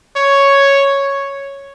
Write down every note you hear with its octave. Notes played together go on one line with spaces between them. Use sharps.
C#5